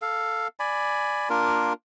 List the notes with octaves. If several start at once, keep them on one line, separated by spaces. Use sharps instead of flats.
A4 F5
D5 G#5 B5
A#3 D4 F4 A#4